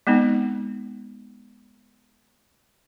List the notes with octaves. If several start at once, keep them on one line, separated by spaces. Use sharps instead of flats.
G#3 B3 C4 D#4